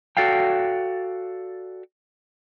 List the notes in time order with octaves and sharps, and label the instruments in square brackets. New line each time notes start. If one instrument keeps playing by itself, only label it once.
[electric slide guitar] F#4 A4 D5 F5 G5